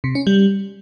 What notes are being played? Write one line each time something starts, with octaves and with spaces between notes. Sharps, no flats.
C3
C#4
G3